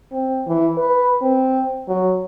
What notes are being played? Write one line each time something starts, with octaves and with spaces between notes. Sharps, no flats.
C4
E3
B4
C4
F#3